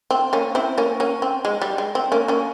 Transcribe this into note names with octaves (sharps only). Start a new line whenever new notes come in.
C4
A#3 C#4
C4 E4
A#3 C#4
A#3 C#4
C4
G#3
G3
G#3
C4
A#3 C#4
A#3 C#4